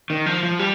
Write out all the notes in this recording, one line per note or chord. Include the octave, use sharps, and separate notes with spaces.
D#3
F3
F3
G3